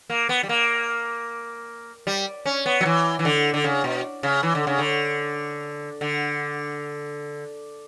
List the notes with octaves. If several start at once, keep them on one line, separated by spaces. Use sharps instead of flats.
A#3
B3
G3
A#3
G3
C#4
B3
F#3
E3
E3
D3
D3
C#3
B2
C#3
E3
D3
C#3
D3
D3